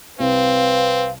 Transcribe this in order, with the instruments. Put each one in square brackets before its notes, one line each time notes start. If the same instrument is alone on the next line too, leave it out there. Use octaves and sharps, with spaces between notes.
[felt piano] C2 [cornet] C4 [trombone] B4 [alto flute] F5